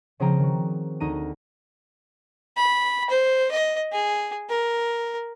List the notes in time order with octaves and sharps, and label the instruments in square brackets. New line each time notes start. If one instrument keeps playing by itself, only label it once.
[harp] C#3 F3 C4 G#4 G5 A#5
D#3 F#4
D2 D#4 A#5 D#7
[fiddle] B5
C5
D#5
G#4
A#4